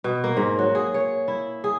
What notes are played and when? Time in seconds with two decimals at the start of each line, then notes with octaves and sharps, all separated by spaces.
0.04 B2
0.24 A#3
0.37 G#2
0.59 F#3
0.75 G#4
0.94 C#5
1.28 E4
1.64 G#4